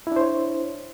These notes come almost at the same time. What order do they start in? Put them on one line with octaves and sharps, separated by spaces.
E4 D4 C5 C#5